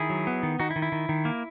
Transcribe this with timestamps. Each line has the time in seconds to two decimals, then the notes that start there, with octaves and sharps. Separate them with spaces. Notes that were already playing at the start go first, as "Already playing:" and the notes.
Already playing: D#3 E4 G#4
0.10 F#3
0.27 B3
0.43 D#3
0.59 D#3 D#4 F#4
0.71 E4
0.76 D#3
0.82 E4
0.92 D#3
1.09 D#3
1.25 A#3